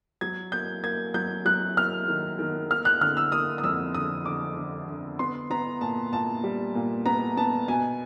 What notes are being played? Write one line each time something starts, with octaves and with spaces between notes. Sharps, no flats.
F#3 G#6
A#3 G6
A#3 G#6
F#3 G6
F#3 F#6
A#3 F6
D#3
D#3
A#3 F6
F#6
D3 F6
E6
A#3 D#6
D#6
F2 E6
D3 D#6
D3 D6
D3
D3
B3 C6
B3 A#5
A#2 A5
A#2 A5
G3
A#2
B3 A#5
B3 A5
B2 G#5